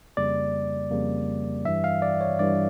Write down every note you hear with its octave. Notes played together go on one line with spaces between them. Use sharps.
F2 C#3 G3 A#3 D5
F2 C#3 G3 A#3
G2 E3 G3 E5
F5
D5
C#5
G2 E3 G3 D5